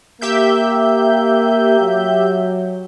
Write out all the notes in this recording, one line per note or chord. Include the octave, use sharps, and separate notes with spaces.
A#3 G4 E5 G6
F#3